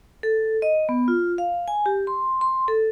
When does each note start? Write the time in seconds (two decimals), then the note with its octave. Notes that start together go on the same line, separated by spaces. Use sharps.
0.23 A4
0.62 D#5
0.89 B3
1.08 F4
1.38 F5
1.68 G#5
1.86 G4
2.07 C6
2.41 C6
2.68 A4